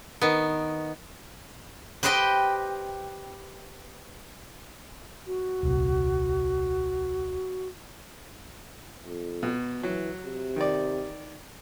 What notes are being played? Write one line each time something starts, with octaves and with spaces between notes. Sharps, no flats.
D#3 B3
G4 B4 C5 D#5 G5
F#4
D#1 C2
F2
B2
E3 F#3
C3
D#3 D5